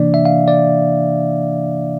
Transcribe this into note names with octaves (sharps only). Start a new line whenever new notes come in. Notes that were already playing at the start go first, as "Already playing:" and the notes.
Already playing: C3 E3 A#3 D4 D5
E5
F5
D5